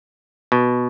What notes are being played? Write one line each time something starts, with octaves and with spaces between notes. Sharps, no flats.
B2